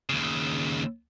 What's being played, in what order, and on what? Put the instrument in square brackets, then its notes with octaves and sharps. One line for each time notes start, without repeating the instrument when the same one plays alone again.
[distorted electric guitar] D#2 C#3